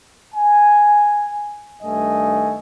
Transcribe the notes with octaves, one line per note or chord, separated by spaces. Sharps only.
G#5
G2 D#3 A3 D#5 G#5